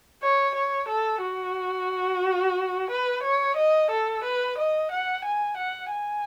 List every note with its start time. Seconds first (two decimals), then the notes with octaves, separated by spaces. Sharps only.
0.23 C#5
0.55 C#5
0.88 A4
1.22 F#4
2.90 B4
3.23 C#5
3.56 D#5
3.91 A4
4.23 B4
4.58 D#5
4.91 F#5
5.25 G#5
5.57 F#5
5.91 G#5